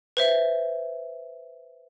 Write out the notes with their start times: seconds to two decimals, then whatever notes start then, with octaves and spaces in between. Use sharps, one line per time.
0.17 B4 C5 E5